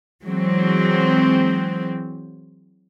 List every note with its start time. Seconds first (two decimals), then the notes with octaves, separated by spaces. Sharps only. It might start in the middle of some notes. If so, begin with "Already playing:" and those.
0.24 E3 F#3 G#3 C4